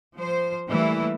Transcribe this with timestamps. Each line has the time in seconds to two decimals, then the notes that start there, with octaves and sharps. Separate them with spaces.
0.15 F3 C5
0.69 E3 G3 A3 A#3 E4 A#4